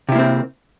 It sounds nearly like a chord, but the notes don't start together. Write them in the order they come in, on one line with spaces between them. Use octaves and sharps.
C3 E4 A#3 C4